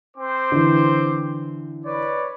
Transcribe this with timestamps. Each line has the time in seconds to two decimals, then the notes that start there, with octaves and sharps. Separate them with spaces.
0.16 C4 C5 D6
0.52 D3 E3
1.85 B4 C#5 D5